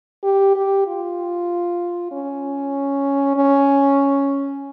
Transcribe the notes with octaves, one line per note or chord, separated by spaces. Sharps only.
G4
G4
F4
C#4
C#4